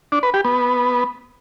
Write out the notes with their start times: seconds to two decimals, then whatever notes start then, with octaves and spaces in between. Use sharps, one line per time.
0.12 D4
0.23 B4
0.34 G4
0.45 B3